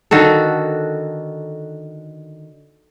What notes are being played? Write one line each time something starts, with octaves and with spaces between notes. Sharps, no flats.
D3 D#3 F#4 A4